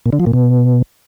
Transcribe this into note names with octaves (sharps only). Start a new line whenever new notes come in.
A#2
D3
F3
A#2
B2